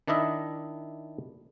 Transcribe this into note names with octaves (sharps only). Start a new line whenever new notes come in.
D#3 D4 E4 D#5 E5